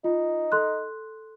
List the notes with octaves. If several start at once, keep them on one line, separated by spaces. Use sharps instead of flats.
D#4 F4
A4 C6 F#6